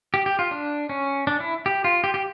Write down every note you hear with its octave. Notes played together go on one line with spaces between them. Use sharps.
G4
G4
F4
D4
C#4
D4
E4
G4
F4
G4
G4